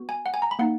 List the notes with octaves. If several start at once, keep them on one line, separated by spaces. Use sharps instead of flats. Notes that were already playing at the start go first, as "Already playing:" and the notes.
Already playing: B3 F#4
G#5
F#5
G#5
A#5
B5
A#3 D#4 F#5